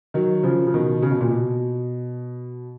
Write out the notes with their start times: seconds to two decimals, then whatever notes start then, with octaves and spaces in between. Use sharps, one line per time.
0.14 D#3 F#3
0.43 C#3 F3
0.67 C#3
0.74 B2 D#3
1.02 C#3
1.11 B2
1.20 A#2
1.30 B2